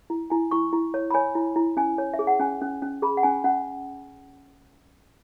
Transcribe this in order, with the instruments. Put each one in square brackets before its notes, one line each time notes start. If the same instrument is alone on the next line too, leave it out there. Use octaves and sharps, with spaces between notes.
[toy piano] E4
E4 G#5
E4 C#6
E4
C#5
B5
C#5 G#5
E4
E4
C#4 G#5
C#5
E5
G#4
F#5
C#4 G#5
C#4
C#4
G#4 B5
F#5
C#4 G#5
C#4 F#5